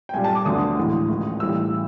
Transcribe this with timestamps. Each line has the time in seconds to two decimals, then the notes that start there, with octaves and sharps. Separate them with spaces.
0.09 G5
0.14 B1 A#2 G3 G#5
0.24 A5
0.35 D6
0.45 D2 D3 F#3 B3 D#6
0.77 A#1 A2 E3 G#3
1.09 A1 G#2 F3 A#3
1.40 B1 A2 E3 G3 E6